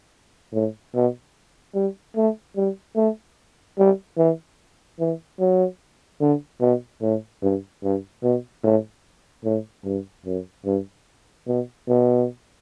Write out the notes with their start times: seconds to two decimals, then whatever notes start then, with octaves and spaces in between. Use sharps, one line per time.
0.54 A2
0.95 B2
1.75 G3
2.16 A3
2.57 G3
2.96 A3
3.78 G3
4.18 E3
5.00 E3
5.40 F#3
6.21 D3
6.61 B2
7.02 A2
7.43 G2
7.83 G2
8.23 B2
8.64 A2
9.45 A2
9.85 G2
10.26 F#2
10.66 G2
11.47 B2
11.88 B2